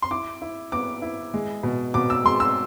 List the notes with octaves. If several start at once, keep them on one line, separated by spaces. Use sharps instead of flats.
C6
E4 D6
E4
B3 D6
E4
G#3
B2
B2 D6
E6
G#3 C6
E6